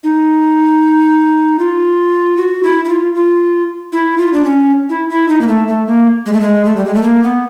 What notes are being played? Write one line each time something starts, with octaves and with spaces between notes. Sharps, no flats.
D#4
F4
F#4
E4
E4
F4
F4
E4
F4
D4
C#4
E4
E4
D#4
A#3
A3
A3
A#3
G#3
A3
G#3
A3
G3
G#3
A3
A#3
B3